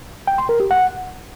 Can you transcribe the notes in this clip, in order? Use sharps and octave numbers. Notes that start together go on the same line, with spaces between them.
G5
C6
A#4
G4
F#5